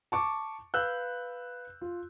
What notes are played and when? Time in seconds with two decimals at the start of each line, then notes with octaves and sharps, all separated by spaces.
0.12 A5 C#6 D6
0.74 B4 F5 E6 F#6 G6
1.81 F4